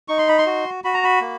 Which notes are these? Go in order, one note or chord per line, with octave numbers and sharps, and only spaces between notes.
D#4 C#6
C6
B5
C6
F#4
F#4 B5
A#5
B5
A#3